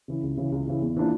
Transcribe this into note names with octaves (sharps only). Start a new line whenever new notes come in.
C#3 E3
C#2
C#3 E3
C#2
C#3 E3
E2
E3 A#3 D4 F4